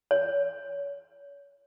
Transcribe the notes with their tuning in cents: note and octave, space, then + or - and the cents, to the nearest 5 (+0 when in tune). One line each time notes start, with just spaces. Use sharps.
C#5 +30